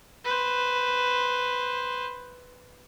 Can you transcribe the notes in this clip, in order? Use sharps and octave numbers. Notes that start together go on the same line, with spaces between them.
B4 C5